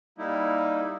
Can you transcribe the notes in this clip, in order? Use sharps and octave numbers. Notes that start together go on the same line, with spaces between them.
G3 A#3 D#4 E4